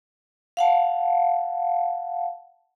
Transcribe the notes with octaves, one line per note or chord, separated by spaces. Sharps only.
F5 F#5 A5